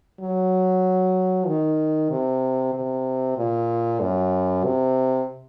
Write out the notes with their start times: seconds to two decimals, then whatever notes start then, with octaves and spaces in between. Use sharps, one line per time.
0.21 F#3
1.47 D#3
2.11 C3
2.74 C3
3.37 A#2
4.00 F#2
4.64 C3